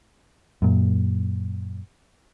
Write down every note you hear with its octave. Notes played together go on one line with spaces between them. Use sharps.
F#2 A#2